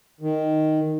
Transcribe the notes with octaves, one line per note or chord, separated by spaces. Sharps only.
D#3